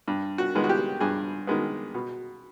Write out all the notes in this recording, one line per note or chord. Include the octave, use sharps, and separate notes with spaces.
G2
F#4
D#3 G#3 B3
F#4
G4
G2 G#4
D#3 G#3 B3
B2